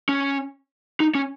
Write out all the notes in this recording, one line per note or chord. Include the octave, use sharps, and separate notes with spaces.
C#4
D#4
C#4